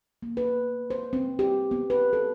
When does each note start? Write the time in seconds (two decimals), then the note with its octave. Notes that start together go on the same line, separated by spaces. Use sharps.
0.23 A#3
0.37 B4
0.90 C5
1.13 C4
1.39 G4
1.71 B3
1.90 B4
2.13 A4